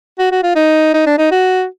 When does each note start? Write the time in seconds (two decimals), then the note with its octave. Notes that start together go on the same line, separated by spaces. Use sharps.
0.19 F#4
0.32 F#4
0.43 F4
0.56 D#4
0.94 D#4
1.06 D4
1.18 D#4
1.31 F#4